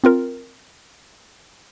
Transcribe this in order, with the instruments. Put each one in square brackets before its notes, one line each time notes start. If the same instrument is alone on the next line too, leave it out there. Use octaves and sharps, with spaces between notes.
[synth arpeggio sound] C4 F4 A#4